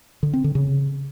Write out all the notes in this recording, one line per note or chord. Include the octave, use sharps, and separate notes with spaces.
D3
C4
D3
C#3